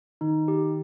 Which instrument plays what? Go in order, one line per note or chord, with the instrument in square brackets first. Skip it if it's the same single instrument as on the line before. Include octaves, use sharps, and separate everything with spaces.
[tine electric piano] D#3 [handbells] D#4
[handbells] G4